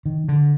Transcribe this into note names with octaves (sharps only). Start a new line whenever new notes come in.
D#3
D3